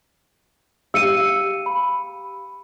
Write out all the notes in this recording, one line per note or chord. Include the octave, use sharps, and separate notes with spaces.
G4 F5 E6 C#7 D#7
B5